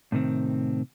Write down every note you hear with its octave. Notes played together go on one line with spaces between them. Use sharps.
A2 C3 D#3 C4